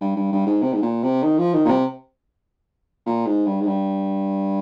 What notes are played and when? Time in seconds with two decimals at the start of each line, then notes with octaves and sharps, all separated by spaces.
0.01 G2
0.16 G2
0.32 G2
0.47 G#2
0.62 C3
0.74 G#2
0.82 A#2
1.03 C3
1.23 D#3
1.38 F3
1.54 D#3
1.65 A#2
1.69 C3
3.06 A#2
3.27 G#2
3.47 G2
3.61 G#2
3.67 G2